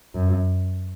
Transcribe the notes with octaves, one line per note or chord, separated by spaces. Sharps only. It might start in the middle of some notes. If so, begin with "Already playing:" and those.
F#2